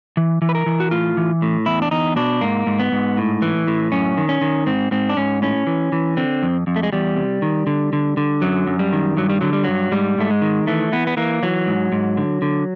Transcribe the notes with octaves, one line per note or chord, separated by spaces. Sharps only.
E3
E3
B4
A#4
E3
F#4
A2 F4
E3
A2
E2 E4
D4
E2 D#4
B2 D4
G#2 A#3
G#2
B3
G#2
A2
E3
A2
F#2 C#4
D#3
C#4
D#3
G#2 C4
G#2 C4
D4
G#2 C#4
A2 C#4
E3
E3
D3 C4
F2
F2
A3
G#3
E2 G3
C3
D#3
D3
D3
D3
F#2 F#3
F#2
G3
D#3
G2 F#3
G3
D3 F#3
G3
G2 F#3
G#2 G3
G#2 A3
G#3
D#3
E3 A3
E3 B3
B3
E3 A#3
E3 F#3
G#2
G#2
D3
D3